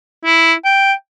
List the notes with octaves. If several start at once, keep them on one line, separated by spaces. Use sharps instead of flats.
E4
G5